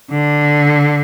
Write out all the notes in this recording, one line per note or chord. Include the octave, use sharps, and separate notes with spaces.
D3